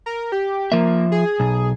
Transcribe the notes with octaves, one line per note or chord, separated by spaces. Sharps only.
A#4
G4
F3 A#3 E5
G#4
B1